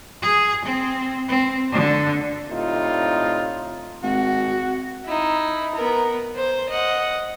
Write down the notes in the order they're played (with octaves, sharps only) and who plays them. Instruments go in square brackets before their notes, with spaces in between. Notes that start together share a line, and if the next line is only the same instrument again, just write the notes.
[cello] G#4
C4
C4
D3
[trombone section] A2 C3 D4 D#4 F4
[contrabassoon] G#1 [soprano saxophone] F#4
[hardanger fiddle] D#4 E4
B3 A#4
C5
D#5 F#5